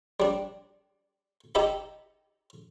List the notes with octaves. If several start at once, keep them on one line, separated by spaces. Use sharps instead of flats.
G3 D4
D#4 G4 D#5 E5 B5